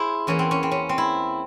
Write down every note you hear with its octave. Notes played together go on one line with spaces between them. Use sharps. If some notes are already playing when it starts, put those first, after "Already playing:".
Already playing: E4 G#4 C5
E2 E3 A#3 C#4
C4
C#4
C4
C#4
C4
E4